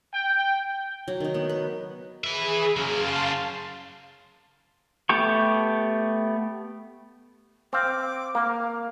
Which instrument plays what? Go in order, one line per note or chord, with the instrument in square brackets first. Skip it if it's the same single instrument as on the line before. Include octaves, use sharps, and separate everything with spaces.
[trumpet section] G5
[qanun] F#3
D#3 D#4
B3
B4
[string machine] G#4 [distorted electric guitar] B4 E5
[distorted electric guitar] C#3 F#3 [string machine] F5 A5 C6
[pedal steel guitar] A3 B3 G4 G5 C#6
[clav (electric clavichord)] C4 F5 [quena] D6
[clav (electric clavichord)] A#3 [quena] F5